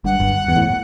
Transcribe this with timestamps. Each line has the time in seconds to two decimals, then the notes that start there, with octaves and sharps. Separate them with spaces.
0.04 G1 G2 F#5
0.20 G1 G2
0.48 E2
0.56 A2